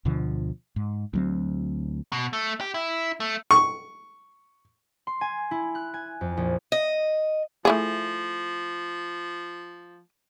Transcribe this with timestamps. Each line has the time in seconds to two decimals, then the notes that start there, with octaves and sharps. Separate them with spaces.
0.05 D2 B2 D3 F3
0.76 G#2
1.14 D2 F#3 C4
2.12 B2
2.33 A3
2.61 G4
2.74 E4
3.20 A3
3.51 C#6
5.07 C6
5.21 G#5
5.51 E4
5.75 F#6
5.94 G#5
6.21 F2
6.37 A#1
6.72 D#5
7.65 F3 A3 E4 G#4